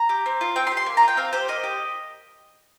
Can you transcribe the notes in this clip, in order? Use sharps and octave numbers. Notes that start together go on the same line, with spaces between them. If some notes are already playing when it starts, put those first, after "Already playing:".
Already playing: A#5
G4
C4
F4
C4 G5
C6
G4
C6
A#3
A#5
F4 G5
C4 F5
G4 C5
A#3 D#5
G4